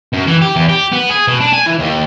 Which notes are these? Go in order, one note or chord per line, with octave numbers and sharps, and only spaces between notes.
F#2
E3
G4
E2
G4
B3
G#4
B2
D4
G#5
E3
D#2